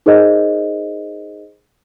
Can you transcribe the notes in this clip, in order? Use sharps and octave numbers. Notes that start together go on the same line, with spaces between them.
D#4 G#4 A#4 C5 D#5